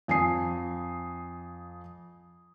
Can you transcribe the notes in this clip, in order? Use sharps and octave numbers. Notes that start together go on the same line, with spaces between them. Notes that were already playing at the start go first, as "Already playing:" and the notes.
F2 G#5 D#6 C7